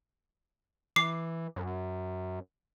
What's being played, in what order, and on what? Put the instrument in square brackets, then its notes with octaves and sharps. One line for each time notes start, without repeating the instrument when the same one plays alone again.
[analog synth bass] E3 [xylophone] D6 C7
[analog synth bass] F#2